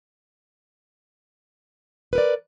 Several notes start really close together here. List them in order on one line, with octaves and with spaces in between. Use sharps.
B4 A#4 D5